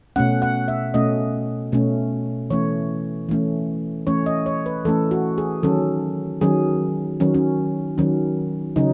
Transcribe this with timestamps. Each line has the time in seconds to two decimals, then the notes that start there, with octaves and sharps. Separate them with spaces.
0.16 B2 A3 C#4 F#5
0.42 F#5
0.68 E5
0.94 B2 A3 C#4 D#5
1.72 B2 A3 C#4
2.50 E3 A3 C#4 C#5
3.29 E3 A3 C#4
4.07 E3 A3 C#4 C#5
4.26 D#5
4.46 C#5
4.66 B4
4.85 E3 A3 C#4 A4
5.11 F#4
5.38 G#4
5.63 D#3 F#3 C#4 A4
6.41 D#3 F#3 C#4 G#4
7.20 D#3 F#3 C#4
7.34 C#4
7.98 D#3 F#3 C#4
8.76 C#3 F#3 C#4 D#4